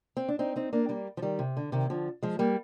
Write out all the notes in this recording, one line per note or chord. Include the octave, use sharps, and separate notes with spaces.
C4
D4
C4 D#4
C4 D#4
A#3 D4
G3 A#3
F3
D#3 G3
C3
D3
C3 D#3
D3 F3
F3 G#3
G3 A#3